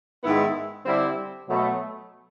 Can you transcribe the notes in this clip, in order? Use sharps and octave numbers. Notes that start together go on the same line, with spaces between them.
G#2 D#3 G#3 B3 E4
D3 G3 C4 E4
B2 F#3 A3